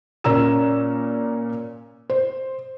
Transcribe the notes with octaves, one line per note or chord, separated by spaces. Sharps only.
A#2 C#4 A#4 A#5 E6 E7
C5